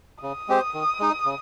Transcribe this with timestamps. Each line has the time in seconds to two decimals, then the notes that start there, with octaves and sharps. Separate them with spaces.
0.23 C#3 D#6
0.48 G#3 C4 G4 C5
0.74 D#3
1.00 G#3 D#4
1.25 C#3